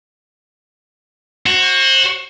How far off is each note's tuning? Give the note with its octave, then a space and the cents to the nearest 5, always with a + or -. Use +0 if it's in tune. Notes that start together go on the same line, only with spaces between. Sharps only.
F#4 +0 C5 +35